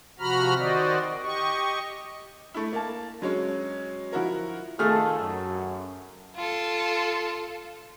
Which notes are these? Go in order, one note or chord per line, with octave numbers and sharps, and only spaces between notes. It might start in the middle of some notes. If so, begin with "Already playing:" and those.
C3 F3 F#4 A#5 B5 F6
D#3 F#4 C5 D5 D#5
G4 D#5 C#6
A3 E4
A#3 A5
F#3 G#3 C#4
F3 E4 F#4 A#4
D#3 A3 F4 G#4 A4 F6
F#2
F4 A4